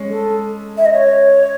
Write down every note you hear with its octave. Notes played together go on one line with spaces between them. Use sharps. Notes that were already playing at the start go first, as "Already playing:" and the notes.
Already playing: G#3 C#4
A4
E5
D#5
C#5